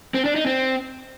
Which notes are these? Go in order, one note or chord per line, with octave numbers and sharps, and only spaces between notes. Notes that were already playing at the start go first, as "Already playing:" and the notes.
C4
D4
D#4
C4